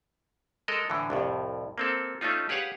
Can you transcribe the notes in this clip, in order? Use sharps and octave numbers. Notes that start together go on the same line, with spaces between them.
G#3 A4 A#4 D#5
A2 D3 E3
C2 F2 A2
A#3 C4 A4
A3 C#4 D#4 F4
G4 G#4 B4 C#5 F5 F#5